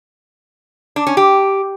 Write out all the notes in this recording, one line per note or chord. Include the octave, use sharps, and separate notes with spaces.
D4
C#4
G4